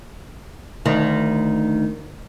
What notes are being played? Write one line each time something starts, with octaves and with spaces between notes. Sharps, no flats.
D2 D#3